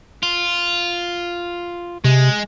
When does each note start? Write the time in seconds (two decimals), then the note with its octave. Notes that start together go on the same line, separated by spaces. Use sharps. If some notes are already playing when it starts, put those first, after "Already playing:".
0.23 F4
2.05 C3 G#3